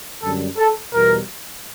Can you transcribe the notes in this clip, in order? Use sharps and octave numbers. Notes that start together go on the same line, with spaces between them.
F#2 D3 G3 A4
A4
E2 B2 G3 A#4